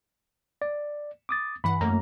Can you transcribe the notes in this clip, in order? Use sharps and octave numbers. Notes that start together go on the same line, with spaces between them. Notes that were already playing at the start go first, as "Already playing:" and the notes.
D5
D6 D#6 A6
G2 E3 F#5 B5
F#2 A3 A#3 A#5